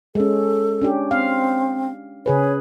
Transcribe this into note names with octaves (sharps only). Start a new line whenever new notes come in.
G#3 C#4 A4
C#4 D4 G4
C4 F5
C#3 G#4 B4 C#5